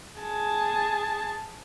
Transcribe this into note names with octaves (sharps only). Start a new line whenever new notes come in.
G#4 A5